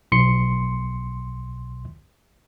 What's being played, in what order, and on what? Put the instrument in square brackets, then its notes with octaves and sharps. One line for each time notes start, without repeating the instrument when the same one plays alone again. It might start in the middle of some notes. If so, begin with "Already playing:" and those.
[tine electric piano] B1 C6 C#7